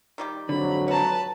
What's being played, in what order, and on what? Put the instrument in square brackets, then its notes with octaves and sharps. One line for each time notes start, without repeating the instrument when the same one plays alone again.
[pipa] D#3 G3 G4
[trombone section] F2 G#2 F#3 [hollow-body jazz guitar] D3 [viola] B5
[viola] B4 A5 [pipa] C#5 A#5